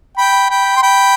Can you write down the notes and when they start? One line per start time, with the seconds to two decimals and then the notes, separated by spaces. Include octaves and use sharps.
0.18 G5 B5
0.50 G5 B5
0.77 C6
0.83 G5 B5